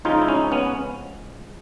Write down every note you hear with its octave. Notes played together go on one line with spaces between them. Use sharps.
C#3 F3 G#3 D#4 F4
E4
C#4 D#4
B3 C#4